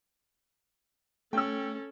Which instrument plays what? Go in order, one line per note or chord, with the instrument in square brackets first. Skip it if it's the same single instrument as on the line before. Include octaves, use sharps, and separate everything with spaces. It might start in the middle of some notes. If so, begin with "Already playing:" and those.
[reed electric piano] A3 [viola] C#4 A4 [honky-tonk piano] G5 E6